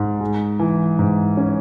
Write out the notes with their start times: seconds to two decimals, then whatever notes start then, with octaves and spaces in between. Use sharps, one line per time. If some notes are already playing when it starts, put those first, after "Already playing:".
Already playing: G#2
0.20 G#3
0.59 E3
0.99 G#2
1.37 C#4